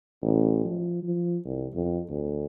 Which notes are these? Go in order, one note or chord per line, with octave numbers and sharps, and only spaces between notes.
A1
F3
F3
C2
F2
D2